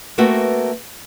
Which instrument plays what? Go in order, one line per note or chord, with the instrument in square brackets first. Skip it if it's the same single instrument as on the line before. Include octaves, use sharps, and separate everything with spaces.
[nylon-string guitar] A3 A#3 C4 F#4 B4 E5